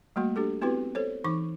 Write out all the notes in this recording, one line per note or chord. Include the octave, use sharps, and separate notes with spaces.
G3 A3 A#3 F#4
D4 G4 A4
B3 C4 E4 F#4 G4 B4
A4 C5 C#5
E3 D#4 C#6 D6